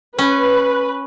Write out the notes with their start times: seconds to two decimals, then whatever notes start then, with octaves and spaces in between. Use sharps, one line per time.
0.19 C#4 B4